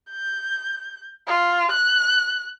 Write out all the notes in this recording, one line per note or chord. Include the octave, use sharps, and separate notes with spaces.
G6
F4
F#6